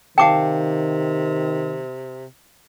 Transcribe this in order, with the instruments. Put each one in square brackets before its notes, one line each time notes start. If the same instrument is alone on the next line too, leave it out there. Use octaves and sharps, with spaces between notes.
[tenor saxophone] C3 [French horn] D#3 [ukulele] F5 A5 [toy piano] G5 D6